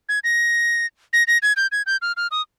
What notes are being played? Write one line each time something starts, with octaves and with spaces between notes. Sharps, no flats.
G#6
A#6
A#6
A#6
G#6
G6
G#6
G6
F6
F6
D#6